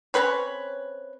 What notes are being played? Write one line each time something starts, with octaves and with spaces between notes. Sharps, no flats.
C4 C#4 B4 C#5